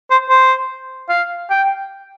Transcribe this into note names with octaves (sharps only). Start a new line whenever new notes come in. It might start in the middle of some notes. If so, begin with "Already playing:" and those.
C5
C5
F5
G5